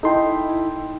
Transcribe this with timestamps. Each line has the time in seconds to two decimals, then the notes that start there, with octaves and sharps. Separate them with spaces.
0.03 D#4 E4 A4 D#5 G5 C6